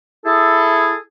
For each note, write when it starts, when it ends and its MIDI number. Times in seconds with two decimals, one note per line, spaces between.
0.25 0.95 64
0.25 0.95 68
0.25 0.95 69